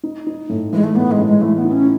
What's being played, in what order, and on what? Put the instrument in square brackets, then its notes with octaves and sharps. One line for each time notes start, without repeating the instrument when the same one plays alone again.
[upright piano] D#4
D#4
A2
[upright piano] E3 [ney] G#3
[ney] A3
[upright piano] A2 [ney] B3
[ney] G#3
[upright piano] A2
[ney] G#3
[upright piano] E3 [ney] A3
[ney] B3
[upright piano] D#4
[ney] C#4